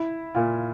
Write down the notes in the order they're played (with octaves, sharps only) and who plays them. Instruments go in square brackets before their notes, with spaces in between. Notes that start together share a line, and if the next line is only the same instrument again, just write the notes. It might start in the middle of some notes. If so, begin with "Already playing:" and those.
Already playing: [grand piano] E4
A#2 F4